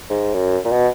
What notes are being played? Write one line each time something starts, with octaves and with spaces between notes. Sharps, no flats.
G#2
F#2
A#2
B2